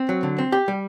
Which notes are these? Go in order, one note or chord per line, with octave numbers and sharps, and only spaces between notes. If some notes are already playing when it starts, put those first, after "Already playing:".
Already playing: C4
F#3
D3
C4
G4
G3